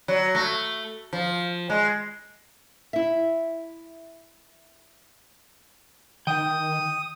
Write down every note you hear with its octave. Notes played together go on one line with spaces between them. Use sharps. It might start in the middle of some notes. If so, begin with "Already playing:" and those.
F#3
A3
F3
G#3
E4 E5
D#3 G5 D#6